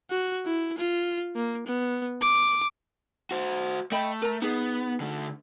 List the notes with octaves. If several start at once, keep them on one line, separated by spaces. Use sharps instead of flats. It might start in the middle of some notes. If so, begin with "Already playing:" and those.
F#4
E4
F4
A#3
B3
D6
F#4 C5
A3 D#5 G5 B5
A#4 A#5
B3 D#4 G#4
D3 A3